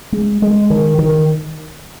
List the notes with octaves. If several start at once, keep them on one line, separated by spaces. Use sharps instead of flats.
G#3
G#3
D#3
D#3